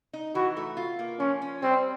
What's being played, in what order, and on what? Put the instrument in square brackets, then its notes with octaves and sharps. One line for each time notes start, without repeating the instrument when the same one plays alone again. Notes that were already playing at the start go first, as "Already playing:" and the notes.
[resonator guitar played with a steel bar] D#4
[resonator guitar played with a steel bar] E3 [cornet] F#4
[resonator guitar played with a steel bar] A3
F4
A#3
[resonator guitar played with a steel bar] F3 [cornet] C#4
[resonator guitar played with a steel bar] C#4
[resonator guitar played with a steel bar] G3 [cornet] C4